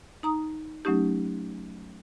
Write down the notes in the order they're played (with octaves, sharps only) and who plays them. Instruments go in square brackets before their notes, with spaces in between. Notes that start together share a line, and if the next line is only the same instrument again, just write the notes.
[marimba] D#4 A#5 D#6
F#3 A3 C#4 D#4 G4